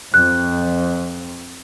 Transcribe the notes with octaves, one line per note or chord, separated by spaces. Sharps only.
F2 F#6